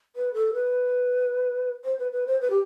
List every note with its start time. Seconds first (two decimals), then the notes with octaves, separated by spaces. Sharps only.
0.16 B4
0.34 A4
0.54 B4
1.84 C5
1.99 B4
2.12 B4
2.27 C5
2.41 B4
2.50 G4